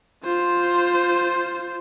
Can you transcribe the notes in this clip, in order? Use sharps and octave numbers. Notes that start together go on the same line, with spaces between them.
F4 C5